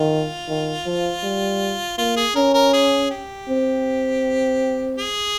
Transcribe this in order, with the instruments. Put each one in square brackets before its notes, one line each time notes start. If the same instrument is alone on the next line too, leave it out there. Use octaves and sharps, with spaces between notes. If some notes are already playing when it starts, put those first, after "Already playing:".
Already playing: [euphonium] D#3 [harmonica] F4
[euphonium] D#3
F3
G3
[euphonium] A#3 [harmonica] F4
[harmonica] G#4
[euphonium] C#4 [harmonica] A#4
[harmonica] A#4
G#4
G4
[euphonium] C4
[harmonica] G#4